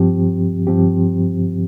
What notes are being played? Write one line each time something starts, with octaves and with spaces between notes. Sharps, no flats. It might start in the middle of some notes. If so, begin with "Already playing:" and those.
Already playing: G2 F3 C4 G4
G2 F3 C4 G4